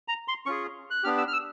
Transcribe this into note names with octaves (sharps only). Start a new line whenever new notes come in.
A#5
C6
C#4 F4 G#4 C#6
F#6
B3 D4 G4 F6
E6
F6
E6